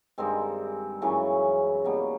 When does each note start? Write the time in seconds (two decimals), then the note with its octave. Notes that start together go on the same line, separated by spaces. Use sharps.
0.18 G2 D#3 G#3 C4
1.02 F#2 C#3 E3 C#4
1.85 B2 G3 A#3